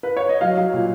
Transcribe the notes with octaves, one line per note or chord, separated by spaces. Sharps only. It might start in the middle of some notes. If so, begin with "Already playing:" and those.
B4
C#5
D#5
F#3 F5
F#3
A#2